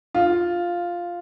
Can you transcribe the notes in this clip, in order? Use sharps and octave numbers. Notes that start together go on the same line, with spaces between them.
F4